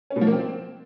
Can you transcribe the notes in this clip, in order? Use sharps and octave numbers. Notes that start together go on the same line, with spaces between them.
C#4
B2
F3
A#3
C4